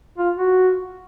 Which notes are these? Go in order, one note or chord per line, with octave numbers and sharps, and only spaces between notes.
F4
F#4